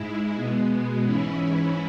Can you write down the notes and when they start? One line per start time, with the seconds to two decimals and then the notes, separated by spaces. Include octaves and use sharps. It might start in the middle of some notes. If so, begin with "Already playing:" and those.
Already playing: G#2 G#3 E4
0.36 B2 G#3 B3
1.03 G#2 E3 C#4 E4